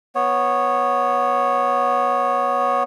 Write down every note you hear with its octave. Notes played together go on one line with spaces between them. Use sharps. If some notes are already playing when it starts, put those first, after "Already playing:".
B3 C#5